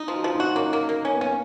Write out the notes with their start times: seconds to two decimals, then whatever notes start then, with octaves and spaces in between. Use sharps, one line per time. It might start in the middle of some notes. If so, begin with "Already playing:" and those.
Already playing: D#4
0.08 F3
0.13 F#4
0.24 F3
0.34 D#4
0.40 F#4
0.56 A#3 C#4
0.73 A#3
0.89 A#3
1.05 C#4
1.13 B3
1.21 A#3 C#4